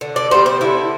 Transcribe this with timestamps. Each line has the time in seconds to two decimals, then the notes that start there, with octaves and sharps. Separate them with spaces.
0.01 D3
0.16 D5
0.31 G3 B3 C5
0.46 C5
0.61 D3 E4